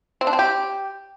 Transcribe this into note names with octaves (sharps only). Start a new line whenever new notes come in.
C4
D4
C4
G4